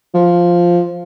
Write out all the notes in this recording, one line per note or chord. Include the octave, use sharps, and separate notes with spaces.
F3